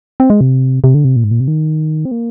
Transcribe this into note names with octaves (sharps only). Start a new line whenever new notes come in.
C4
G#3
C3
C3
D3
C3
A#2
G#2
A#2
C3
D#3
C4
A#3